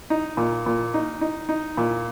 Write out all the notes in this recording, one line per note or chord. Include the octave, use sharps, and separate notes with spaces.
D#4
A#2
A#2
D#4
D#4
D#4
A#2